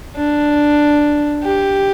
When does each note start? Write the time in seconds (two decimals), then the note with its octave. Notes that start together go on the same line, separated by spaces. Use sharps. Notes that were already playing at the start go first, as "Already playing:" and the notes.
0.16 D4
1.44 G4